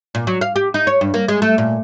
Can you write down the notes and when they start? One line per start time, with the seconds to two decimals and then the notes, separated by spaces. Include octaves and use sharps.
0.15 A#2
0.27 F#3
0.41 F5
0.56 G4
0.74 D#4
0.87 C#5
1.01 G2
1.14 A#3
1.28 G#3
1.42 A3
1.58 A#2